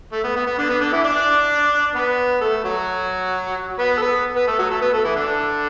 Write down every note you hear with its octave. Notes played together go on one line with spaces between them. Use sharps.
A3
B3
B3
B3
D3 D4
B3
D3 D4
E3 E4
D4 D5
B3 B4
A3 A4
F#3 F#4
B3 B4
A4
B3 B4
B3 B4
A3 A4
F#3 F#4
A3 A4
B3 B4
A3 A4
E3 E4
D3 D4